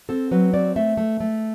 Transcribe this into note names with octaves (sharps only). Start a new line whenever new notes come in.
C4 A4
F#3 B4
C4 D5
A3 E5
A3
A3